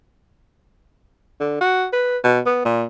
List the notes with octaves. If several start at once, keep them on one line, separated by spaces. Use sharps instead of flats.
D3
F#4
B4
B2
B3
A#2